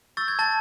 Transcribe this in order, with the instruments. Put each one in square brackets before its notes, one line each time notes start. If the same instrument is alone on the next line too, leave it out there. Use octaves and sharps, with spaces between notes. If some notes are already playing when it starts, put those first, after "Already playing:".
[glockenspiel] C#6 E6 G6 A6
G#6
A5 A6